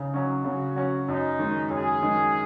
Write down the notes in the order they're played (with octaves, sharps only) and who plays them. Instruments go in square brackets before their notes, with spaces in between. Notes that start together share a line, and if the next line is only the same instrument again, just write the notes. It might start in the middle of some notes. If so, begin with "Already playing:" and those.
Already playing: [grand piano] C#3 [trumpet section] D#4
[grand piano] F#3 C#4
[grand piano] C#3 [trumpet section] F#4
[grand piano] F#3 C#4
[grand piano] F#2 [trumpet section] D#4
[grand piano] D#3 G#3
[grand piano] F#2 [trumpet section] G#4
[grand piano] D#3 G#3